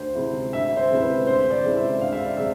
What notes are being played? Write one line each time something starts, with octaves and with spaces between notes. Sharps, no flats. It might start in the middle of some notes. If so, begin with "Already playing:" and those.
Already playing: D2 C5
C3 G#3 C4 E4
D2 E5
C5
C3 G#3 C4 E4
B4
D2 C5
D5
C3 G#3 C4 E4
E5
D2 F5
E5
D5
C3 G#3 E5